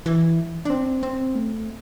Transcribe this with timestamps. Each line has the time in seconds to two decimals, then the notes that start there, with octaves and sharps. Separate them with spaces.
0.06 E3
0.65 D4
0.70 C4
1.03 C4
1.35 A3